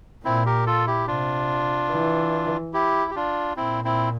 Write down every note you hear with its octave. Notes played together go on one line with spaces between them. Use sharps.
A#2 C4 E4
G4 A#4
F4 A4
E4 G4
C3 D4 F4
E3
E4 G4
G4
D4 F4
A#2 C4 E4
C4 E4